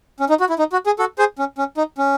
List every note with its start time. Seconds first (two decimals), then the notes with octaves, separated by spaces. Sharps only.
0.20 C#4
0.29 D#4
0.40 F#4
0.49 E4
0.59 D#4
0.72 F#4
0.86 G#4
0.99 F#4 A4
1.18 G#4 C5
1.39 C#4
1.58 C#4
1.77 D#4
1.98 C#4